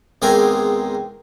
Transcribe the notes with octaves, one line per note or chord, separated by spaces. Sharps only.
E2 D#3 G#3 C4 G#5 D6